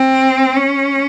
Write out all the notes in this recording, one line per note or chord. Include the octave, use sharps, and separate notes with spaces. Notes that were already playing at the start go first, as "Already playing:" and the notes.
Already playing: C4
C#4